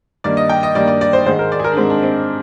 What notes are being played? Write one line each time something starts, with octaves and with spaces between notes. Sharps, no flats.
G2 D#3 A#3 D5
D#5
G5
D#5
G2 D#3 A#3 D5
D5
D5
C5
G#2 D#3 G#3 C5
A#4
D5
G#4
A#4
D4
G#2 D#3 G#3 C4
D4
C4